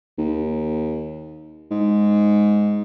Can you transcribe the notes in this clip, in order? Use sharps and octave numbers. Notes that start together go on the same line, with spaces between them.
D#2
G#2